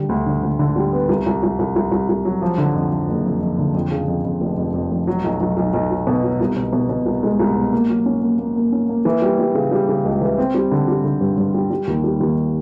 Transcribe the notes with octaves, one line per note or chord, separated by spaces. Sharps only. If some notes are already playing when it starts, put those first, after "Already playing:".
Already playing: D3 G3
D2
D3
D2
D3
G3
B3
C2
C2
C2
C2
C2
C2
C2
F#3
F3
D3
F2
F3
F#1
F2
F2
D3
F2
C#3
F2
F2
F1
F2
F2
F1
F#3
B1
B1
B1
B1
F#3
B2
F#3
C2
B2
B2
B2
C2
G#3
C2
B2
A#3
F#3
C#4
A#3
A#3
A#3
C#4
A#3
E3
G3
G3
C#3
G3
C#3
C#2
E3
C4
G3
D3
G3
D3
G2
G2
G3
G3
D#2
G3
D#2